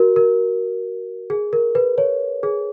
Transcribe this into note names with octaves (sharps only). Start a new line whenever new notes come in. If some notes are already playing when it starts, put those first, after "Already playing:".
Already playing: F#4 A#4
A#4
G#4
A#4
B4
C#5
G#4